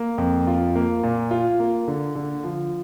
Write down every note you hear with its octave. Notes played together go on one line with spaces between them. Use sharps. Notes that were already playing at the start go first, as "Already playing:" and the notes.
Already playing: A#3
F2
F4
A#3
A#2
F4
A#3
D3
D3
F3